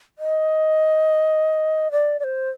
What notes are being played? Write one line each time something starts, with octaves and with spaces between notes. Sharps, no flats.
D#5
D5
D5
C5